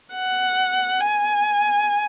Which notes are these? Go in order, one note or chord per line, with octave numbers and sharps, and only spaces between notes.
F#5
G#5